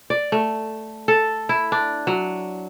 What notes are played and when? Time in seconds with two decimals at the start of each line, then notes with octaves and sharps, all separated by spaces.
0.10 D5
0.32 A3
1.08 A4
1.49 E4
1.72 D4
2.07 F#3